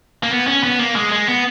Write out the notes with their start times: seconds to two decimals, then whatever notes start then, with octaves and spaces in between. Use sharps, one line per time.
0.23 A#3
0.31 B3
0.47 C#4
0.63 B3
0.79 A#3
0.96 G#3
1.12 G#3
1.28 B3